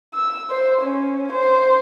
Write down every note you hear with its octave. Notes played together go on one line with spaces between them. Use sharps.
E6
C5
C#4
C5